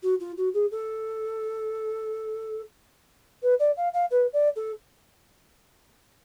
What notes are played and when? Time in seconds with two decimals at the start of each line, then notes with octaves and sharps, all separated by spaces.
0.03 F#4
0.20 F4
0.37 F#4
0.54 G#4
0.71 A4
3.42 B4
3.59 D5
3.77 F5
3.93 F5
4.11 B4
4.33 D5
4.56 A4